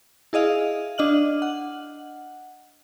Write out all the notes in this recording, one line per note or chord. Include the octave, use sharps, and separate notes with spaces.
E4 G#4 D#5 F5
D4 D#5 F6 F#7
F#5